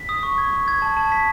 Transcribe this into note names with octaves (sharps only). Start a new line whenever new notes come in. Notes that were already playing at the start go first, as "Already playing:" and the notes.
Already playing: B6
D#6
C#6
G#6
C#6
G#6
A5
A5
B6